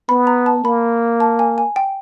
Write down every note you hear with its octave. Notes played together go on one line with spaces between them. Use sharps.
B3 B5
A#5
A5
A#3 B5
A5
G#5
G#5
G5